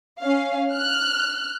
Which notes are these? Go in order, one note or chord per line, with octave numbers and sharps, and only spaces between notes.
C#4 F5
F6 F#6